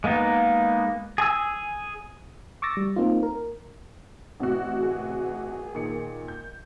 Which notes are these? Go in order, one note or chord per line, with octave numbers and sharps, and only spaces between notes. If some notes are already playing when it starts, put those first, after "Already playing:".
G#3 A#3 B3 D#4
G#4 G#5 E6
C#6 D6 E6 A6 A#6
G3
A#3 C4 D#4 F4
A#4
A1 C3 F#4
G#4
A#2 D#3 C#7
G6